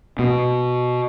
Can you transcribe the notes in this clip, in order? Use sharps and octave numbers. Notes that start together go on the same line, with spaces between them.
B2